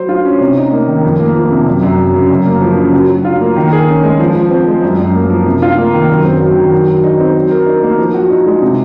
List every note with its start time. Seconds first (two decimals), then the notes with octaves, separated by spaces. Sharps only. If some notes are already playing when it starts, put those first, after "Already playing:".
Already playing: F#3 C5
0.09 F4
0.25 C#4
0.41 C3
0.57 D#4
0.72 A#3
0.88 D#3
1.04 F2
1.19 A#3
1.35 F3
1.52 C3
1.66 F#2
1.83 F#2
1.99 F#3
2.15 C#3
2.30 F#2
2.46 A#3
2.62 F3
2.77 C#3
2.93 F#3
3.09 F#3
3.25 F4
3.40 A#3
3.56 D#3
3.72 G#4
3.89 C#4
4.04 G#3
4.20 F3
4.36 F3
4.51 C4
4.68 G#3
4.82 F#2
4.98 F#2
5.15 A#3
5.30 F3
5.45 C3
5.62 F4
5.78 A#3
5.93 D#3
6.09 F#2
6.25 C4
6.40 F#3
6.56 D#3
6.72 F#3
6.88 F#3
7.04 D#4
7.20 C4
7.36 F#3
7.51 A#4
7.66 D#4
7.83 A#3
7.98 F3
8.14 F#4
8.30 D#4
8.47 G#3
8.62 C3